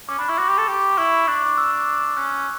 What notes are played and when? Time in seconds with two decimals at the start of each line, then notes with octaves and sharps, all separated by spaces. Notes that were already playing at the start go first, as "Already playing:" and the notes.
0.09 C#4 D6
0.19 D4 B5
0.29 E4 C#6
0.39 F#4 D6
0.49 G4
0.58 A4
0.68 G4
0.98 E4 C#6
1.27 D4 D6
1.47 D6
1.58 E6
2.17 C#4 F#6